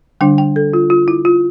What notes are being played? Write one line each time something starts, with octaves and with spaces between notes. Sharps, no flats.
D3 G3 D4 G5
G5
A4
F4
F4
E4
F4